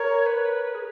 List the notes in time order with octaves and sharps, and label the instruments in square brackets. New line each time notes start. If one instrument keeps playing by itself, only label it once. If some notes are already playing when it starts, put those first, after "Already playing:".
Already playing: [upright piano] A#4 [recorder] C#5
[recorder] B4
G#4